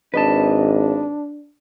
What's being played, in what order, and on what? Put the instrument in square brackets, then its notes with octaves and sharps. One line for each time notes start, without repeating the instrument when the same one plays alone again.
[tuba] G#1 [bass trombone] D4 [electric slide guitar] B4 D#5 A5